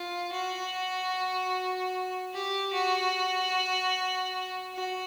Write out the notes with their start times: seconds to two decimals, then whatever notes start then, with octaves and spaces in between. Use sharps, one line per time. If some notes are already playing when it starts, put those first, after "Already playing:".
Already playing: F4
0.32 F#4
2.33 G4
2.73 F#4
4.74 F#4